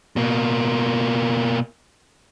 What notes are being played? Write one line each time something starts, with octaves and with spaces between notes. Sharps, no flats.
B2 A#3